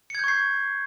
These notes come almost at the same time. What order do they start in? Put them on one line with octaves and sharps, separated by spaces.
C#7 G#6 G6 C#6 C7